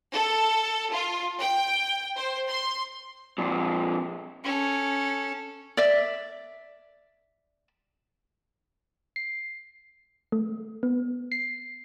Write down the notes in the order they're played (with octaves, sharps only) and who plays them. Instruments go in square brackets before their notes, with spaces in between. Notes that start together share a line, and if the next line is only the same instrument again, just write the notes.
[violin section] A4
F4
G5
C5
C6
[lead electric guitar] F2 A#2
[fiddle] C#4 A4
[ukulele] D5 E5
[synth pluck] C7
A3
B3
C7